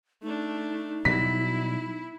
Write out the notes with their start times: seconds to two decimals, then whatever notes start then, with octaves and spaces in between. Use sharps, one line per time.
0.22 A3 D4 D#4
1.05 B2 F#3 G3 E4 B6